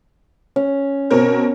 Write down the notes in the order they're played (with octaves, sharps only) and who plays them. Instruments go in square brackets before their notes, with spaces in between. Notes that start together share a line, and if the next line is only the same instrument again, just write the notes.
[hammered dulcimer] C#4
[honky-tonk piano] B2 C4 A#4 [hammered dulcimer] C#5